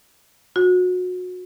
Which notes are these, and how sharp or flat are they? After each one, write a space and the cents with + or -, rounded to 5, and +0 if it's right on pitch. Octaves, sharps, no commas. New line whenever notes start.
F#4 -30